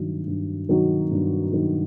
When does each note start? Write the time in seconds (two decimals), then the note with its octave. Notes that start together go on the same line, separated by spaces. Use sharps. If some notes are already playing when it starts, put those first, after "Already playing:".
Already playing: G2 D#3 F#3
0.27 G2
0.69 D#3 F#3
1.11 G2
1.53 D#3 F#3